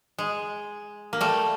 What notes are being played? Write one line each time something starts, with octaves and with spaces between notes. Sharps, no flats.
G#3
A#3
G3 A3